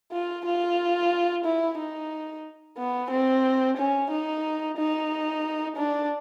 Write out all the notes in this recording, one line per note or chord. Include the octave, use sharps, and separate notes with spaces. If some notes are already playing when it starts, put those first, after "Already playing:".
F4
F4
E4
D#4
B3
C4
C#4
D#4
D#4
D4